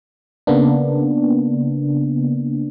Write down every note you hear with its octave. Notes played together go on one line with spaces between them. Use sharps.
C#3 A#3 B3 D4